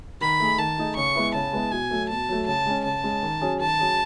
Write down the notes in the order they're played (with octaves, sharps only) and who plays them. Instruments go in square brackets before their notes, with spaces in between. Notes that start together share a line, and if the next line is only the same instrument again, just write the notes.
[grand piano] D#3 [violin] B5
[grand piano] A3 D#4 G#4
[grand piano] D#3 [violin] A5
[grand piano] A3 D#4 G#4
[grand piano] C#3 [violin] C#6
[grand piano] G#3 B3 E4
[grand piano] C#3 [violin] A5
[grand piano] G#3 B3 E4
[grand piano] B2 [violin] G#5
[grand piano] F#3 A3
[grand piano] B2 [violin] A5
[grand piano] F#3 A3
[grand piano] C#3 [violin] A5
[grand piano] G#3 C#4
[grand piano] C#3 [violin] A5
[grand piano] G#3 C#4
D#3
F#3 C#4 G#4
[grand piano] D#3 [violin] A5
[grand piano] F#3 C#4 G#4